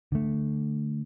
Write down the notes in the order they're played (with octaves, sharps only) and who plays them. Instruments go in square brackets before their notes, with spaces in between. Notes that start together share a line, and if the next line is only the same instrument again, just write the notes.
[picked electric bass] D3 A3